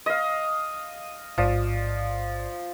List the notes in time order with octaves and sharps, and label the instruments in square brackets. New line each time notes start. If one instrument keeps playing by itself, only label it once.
[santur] D#5 F5
[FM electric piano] A1 G#2 D5 [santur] F3